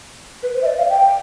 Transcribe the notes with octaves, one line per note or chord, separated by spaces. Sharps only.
B4
C5
E5
D5
F5
G5